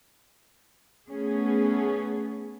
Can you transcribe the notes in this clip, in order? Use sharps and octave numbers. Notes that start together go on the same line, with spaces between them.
A3 B3 C#4 G#4